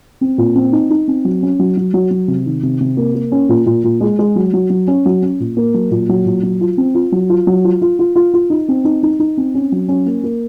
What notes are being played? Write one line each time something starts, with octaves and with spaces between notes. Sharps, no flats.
C4
A#2
C4
D#4
D#4
C4
F#3
C#4
F#3
F#3
F#3
F#3
C3
D#3
C3
C3
A#3
A#3
C#4
A#2
A#2
A#2
G#3
G#3
F#3
F#3
F#3
C#4
F#3
C#4
A#2
A#3
F#3
A#2
F#3
A#2
F#3
F4
C4
F4
F#3
F4
F#3
F4
F4
F4
F4
F4
D#4
C4
D#4
D#4
D#4
C4
C#4
F#3
C#4
A#3
A#3